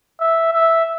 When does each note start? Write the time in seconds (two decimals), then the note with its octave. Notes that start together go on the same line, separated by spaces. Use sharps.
0.20 E5
0.53 E5